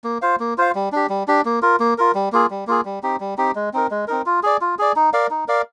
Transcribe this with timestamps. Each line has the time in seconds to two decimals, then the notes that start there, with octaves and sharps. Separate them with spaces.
0.04 A#3
0.22 F4 C5 F5
0.40 A#3
0.58 F4 C5 F5
0.75 G3
0.92 D4 G4
1.09 G3
1.28 D4 G4
1.45 A#3
1.62 F4 A#4
1.80 A#3
1.98 F4 A#4
2.15 G3
2.32 A#3 F4 G#4
2.50 G3
2.67 A#3 F4 G#4
2.85 G3
3.03 C4 D#4 G4
3.20 G3
3.37 C4 D#4 G4
3.55 G#3
3.73 C4 D#4 A#4
3.91 G#3
4.08 C4 D#4 A#4
4.26 F4
4.43 G#4 D5
4.61 F4
4.79 G#4 D5
4.96 D#4
5.13 A#4 D5 F5
5.30 D#4
5.48 A#4 D5 F5